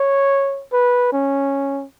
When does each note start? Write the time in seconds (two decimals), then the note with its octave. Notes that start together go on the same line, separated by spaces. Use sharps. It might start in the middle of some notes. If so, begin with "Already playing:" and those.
Already playing: C#5
0.73 B4
1.13 C#4